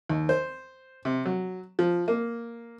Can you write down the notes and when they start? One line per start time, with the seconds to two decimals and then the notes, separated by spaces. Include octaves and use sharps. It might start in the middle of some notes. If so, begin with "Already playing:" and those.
0.09 D#2
0.29 C5
1.05 C3
1.26 F#3
1.79 F3
2.08 A#3